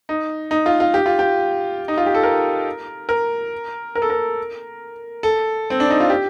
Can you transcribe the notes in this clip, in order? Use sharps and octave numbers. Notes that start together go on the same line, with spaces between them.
D#4
D#4
F4
F4
G4
F4
G4
D#4
F4
G4
A4
A#4
A#4
A#4
A4
A#4
A4
C4
D4
D#4
F4
G4